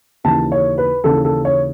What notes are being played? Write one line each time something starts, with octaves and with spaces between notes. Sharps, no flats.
D#2 C#3 E3 A5
C#5
B4
D#2 C#3 E3 A4
A4
C#5